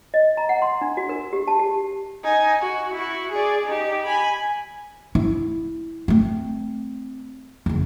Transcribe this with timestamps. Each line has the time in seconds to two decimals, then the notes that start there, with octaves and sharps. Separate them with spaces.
0.14 D#5
0.37 A#5
0.49 F#5
0.62 C6
0.81 D4
0.97 F#4
1.09 A#4
1.33 G4
1.48 A5
1.59 G4
2.23 D#4 G#5
2.61 F#4
2.93 E4 F#4
3.32 G#4 D5
3.66 D#4 G4
4.05 G#5 B5
5.15 E4
6.08 A3 C4
7.66 F#1 E2